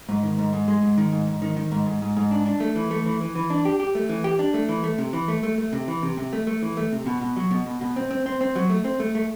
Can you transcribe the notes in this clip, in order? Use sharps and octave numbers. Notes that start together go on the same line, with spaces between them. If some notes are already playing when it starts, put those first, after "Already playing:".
G#2
D#3
G#2
G#2
G#3
G#2
D#3
G#2
G#2
D#3
D#3
G#2
G#2
G#2
G#2
D4
D4
A3
E3
A3
E3
E3
E3
D4
G4
G4
A3
E3
G4
D4
A3
E3
A3
C3
E3
A3
A3
A3
C3
E3
C3
C3
A3
A3
E3
A3
C3
B2
B2
F#3
B2
B2
B2
C4
C4
C4
C4
F#3
A3
C4
A3
A3